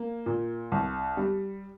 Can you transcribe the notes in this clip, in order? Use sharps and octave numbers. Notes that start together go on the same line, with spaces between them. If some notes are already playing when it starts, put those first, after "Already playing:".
Already playing: A#3
A#2
C2
G3